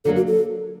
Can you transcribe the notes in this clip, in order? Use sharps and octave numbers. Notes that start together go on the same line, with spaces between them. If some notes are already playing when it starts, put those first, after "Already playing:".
D3 F#3 A#3 A4
F#4
A4